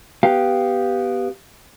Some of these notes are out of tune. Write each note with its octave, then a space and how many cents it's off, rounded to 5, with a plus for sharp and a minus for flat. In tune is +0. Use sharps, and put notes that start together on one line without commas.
B3 +0 G4 -5 F5 +0